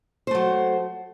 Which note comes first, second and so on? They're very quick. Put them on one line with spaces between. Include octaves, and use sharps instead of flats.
C5 A3 F#3